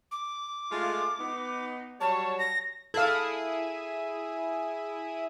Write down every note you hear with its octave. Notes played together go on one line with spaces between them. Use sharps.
D6
G#3 A3 F4
B3 D#4
F#3 G3 C#5 A5
A#6
E4 G#4 A4 F5 D#6